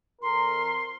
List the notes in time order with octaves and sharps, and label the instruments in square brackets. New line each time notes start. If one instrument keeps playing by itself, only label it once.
[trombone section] F2 A#4 [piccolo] C6